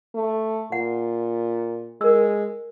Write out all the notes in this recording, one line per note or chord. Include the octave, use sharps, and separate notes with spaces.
A3
A#2 F#5
G#3 A#4 E6